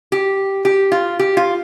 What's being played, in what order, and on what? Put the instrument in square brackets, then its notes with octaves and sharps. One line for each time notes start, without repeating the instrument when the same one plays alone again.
[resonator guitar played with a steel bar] G4
G4
F4
G4
F4